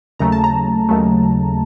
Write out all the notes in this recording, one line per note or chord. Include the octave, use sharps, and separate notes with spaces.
D#2 C#3 F#3 A3 A#5
A5
A#5
D#2 C#3 F#3 A3